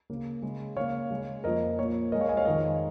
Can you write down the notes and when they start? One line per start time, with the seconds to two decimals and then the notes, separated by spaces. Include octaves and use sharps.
0.10 C#3 A#3
0.42 C#3 G#3
0.76 C#3 A#3 C#5 F5
1.10 C#3 G#3
1.44 F2 F3 A#3 A#4 D#5
1.79 A#2 A#3 C#5
2.12 A#2 A#4 D#5
2.15 G#3
2.20 C#5 F5
2.29 D#5 G#5
2.37 C#5 F5
2.45 F2 D#3 G#3 A#4 D#5